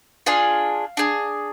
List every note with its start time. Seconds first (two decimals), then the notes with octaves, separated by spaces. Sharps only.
0.26 D4 F4 G#4 F5
0.97 D4 G#4